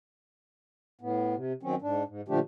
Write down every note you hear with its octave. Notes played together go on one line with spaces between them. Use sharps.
A2 B3
C3
D#3 F#3 C4 C#4
G#2 D4
G#2
A#2 D3 F3 A3 D4 G4